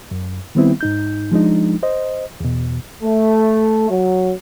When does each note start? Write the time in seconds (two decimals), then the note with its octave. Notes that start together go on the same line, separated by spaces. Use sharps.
0.11 F#2
0.55 D#3 G3 B3 C4 E4
0.81 G#2 D#4 G6
1.31 F3 G#3 D4 D#4
1.83 C5 D#5
2.40 E2 B2
3.02 A3
3.89 F#3